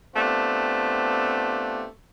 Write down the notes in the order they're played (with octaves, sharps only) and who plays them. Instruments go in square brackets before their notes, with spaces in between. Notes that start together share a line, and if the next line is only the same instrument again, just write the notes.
[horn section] A3 B3 C4 D4 F4 G4